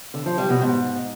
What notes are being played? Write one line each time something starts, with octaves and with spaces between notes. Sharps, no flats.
D3
F3
G3
B2
G#2